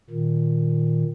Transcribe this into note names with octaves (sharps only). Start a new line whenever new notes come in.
A#2 D#3